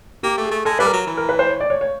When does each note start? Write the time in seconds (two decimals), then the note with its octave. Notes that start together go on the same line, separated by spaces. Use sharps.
0.23 A#3 G4
0.38 A3
0.45 G#4
0.52 A3
0.65 G#3 A4
0.79 G3 B4
0.86 A#4
0.93 F#3
1.07 E3
1.17 A#4
1.29 B4
1.39 C5
1.49 C#5
1.60 D5
1.70 C#5
1.81 C#5